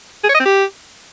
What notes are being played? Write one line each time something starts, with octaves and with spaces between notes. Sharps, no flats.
G#4
C#5
D#5
C4
G4